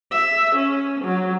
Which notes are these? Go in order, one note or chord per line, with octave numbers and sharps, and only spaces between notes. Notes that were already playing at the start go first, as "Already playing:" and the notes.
E5
C#4
F#3